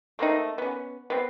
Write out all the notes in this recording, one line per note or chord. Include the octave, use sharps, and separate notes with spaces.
A3 A#3 C4 D#4
B3 C#4
B3 C4